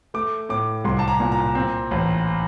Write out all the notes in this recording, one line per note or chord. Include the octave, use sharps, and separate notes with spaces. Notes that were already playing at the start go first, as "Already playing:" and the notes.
A3 D6
A2 D6
C2 C6
A5
A#5
A#2
A#5
C4
A1